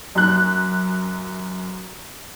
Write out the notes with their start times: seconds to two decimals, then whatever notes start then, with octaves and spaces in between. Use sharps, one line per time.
0.15 F#2 F#6